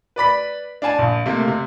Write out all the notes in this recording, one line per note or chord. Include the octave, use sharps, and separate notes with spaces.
B4 D5 B5 B6
D4 F5 G#5 A5
A#1
C3 A3 A#3
C3